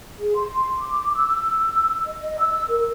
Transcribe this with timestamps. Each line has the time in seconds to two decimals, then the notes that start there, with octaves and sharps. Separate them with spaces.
0.19 G#4
0.35 C6
0.78 D6
1.15 E6
2.05 D#5
2.21 D#5
2.40 E6
2.68 A#4